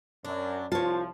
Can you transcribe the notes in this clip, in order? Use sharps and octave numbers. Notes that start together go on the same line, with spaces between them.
F#2 D4
C2 F3 F4 C#5 A5